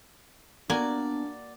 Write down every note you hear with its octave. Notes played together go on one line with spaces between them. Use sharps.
A#3 B3 D4 F#4 D5 G#5